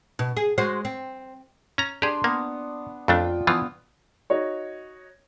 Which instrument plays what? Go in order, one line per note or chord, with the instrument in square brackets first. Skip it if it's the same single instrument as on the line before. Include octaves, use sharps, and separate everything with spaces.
[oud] B2
G#4
G#3 F#4 C5
C4
[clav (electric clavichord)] C#4 A#5
[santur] D4 C6 [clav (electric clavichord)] G4 G#4
[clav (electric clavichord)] A#3 [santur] B3
[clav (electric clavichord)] F2 A3 D4 [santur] F4 G5
[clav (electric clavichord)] E3 F3 F4 [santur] B3
[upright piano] D#4 F#4 C#5